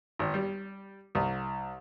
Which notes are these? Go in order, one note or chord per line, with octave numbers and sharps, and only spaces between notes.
G#1
G3
C2